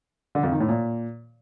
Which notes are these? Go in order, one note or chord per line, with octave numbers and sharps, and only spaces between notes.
D3
F2
D#3
A2
A#2